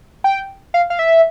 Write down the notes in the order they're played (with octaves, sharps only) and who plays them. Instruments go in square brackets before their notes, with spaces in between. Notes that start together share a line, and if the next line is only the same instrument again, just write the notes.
[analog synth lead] G5
F5
F5
E5